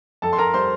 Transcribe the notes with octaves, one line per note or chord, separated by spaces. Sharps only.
F2 A4 A5
C6
A#4 A#5
G3 C5 C6